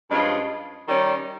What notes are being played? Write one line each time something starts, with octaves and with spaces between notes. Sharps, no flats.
G2 F3 G#3 C#4 F4
D#3 G3 C#4